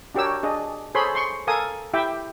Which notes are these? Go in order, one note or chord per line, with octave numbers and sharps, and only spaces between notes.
D4 F#4 G4 A#4 C#5 E6
D4 G#4 D#5
G#4 A4 C5 C#5 B5 C6
C6 C#6
A4 A#4 F5 G#5 D#6
E4 G4 E5 G5 D6